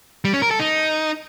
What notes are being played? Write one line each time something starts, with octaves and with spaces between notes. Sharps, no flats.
G3
C#4
A#4
A4
D#4